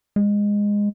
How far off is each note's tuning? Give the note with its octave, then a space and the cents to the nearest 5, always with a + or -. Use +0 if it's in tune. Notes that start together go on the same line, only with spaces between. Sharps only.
G#3 -15